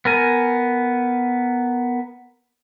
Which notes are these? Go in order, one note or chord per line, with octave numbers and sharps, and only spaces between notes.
B3 A#4 G#5